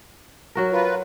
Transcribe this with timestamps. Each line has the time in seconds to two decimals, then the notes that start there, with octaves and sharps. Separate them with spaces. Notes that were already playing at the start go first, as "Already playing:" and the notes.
0.55 F#3 F#4 A#4
0.72 F4 B4